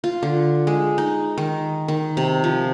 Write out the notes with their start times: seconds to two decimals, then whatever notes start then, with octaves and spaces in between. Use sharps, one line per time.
0.04 F4
0.23 D3
0.67 G#3
0.98 D#4
1.38 D#3
1.88 D#3
2.17 C3
2.44 F3